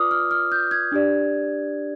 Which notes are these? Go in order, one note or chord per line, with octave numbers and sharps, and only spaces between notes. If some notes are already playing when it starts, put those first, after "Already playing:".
Already playing: F4 B4 D5 D6 D#6 F6
F6
F6
G6
G#6
D4 G4 D5